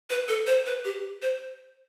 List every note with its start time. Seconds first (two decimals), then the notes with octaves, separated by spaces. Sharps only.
0.10 B4
0.28 A4
0.47 C5
0.66 B4
0.85 G4
1.22 C5